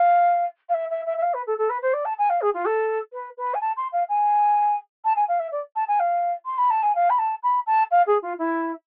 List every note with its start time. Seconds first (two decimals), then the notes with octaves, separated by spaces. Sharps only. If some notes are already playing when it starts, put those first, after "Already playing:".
Already playing: F5
0.69 F5
0.74 E5
0.90 E5
1.06 E5
1.18 E5
1.22 F5
1.34 B4
1.47 A4
1.58 A4
1.70 B4
1.82 C5
1.94 D5
2.05 A5
2.18 G#5
2.30 F5
2.41 G#4
2.54 F4
2.66 A4
3.13 B4
3.38 B4
3.54 G#5
3.61 A5
3.77 C6
3.93 F5
4.09 G#5
5.05 A5
5.16 G#5
5.28 F5
5.40 E5
5.52 D5
5.76 A5
5.88 G#5
6.00 F5
6.46 C6
6.58 B5
6.70 A5
6.83 G#5
6.95 F5
7.10 B5
7.19 A5
7.43 B5
7.67 A5
7.91 F5
8.07 G#4
8.22 F4
8.39 E4